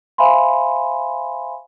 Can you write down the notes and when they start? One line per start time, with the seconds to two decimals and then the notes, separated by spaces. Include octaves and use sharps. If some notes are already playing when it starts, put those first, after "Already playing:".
0.18 C5 E5 F5 G#5 B5 C6